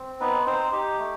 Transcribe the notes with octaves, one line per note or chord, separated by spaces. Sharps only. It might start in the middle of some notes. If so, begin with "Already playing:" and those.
Already playing: C4
B3 D#4 B4
C4 D#4 C5
D#4 G4
A3